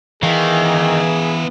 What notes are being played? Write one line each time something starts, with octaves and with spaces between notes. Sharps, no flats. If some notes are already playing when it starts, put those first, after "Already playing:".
D#3 E3 B3 G#4 F5